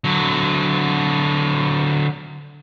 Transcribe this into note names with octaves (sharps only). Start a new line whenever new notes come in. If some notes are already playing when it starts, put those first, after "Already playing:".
D3 F#3